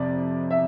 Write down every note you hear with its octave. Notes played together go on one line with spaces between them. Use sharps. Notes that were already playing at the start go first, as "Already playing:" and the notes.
Already playing: F2 C3 D5
E5